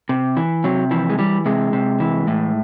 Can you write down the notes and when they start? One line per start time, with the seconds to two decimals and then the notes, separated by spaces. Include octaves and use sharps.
0.09 C3
0.37 E3
0.64 C3 F#3
0.91 E3 F3
1.10 G#3
1.19 E3 G3
1.46 C3 G#3
1.73 C3
2.00 E3
2.27 A2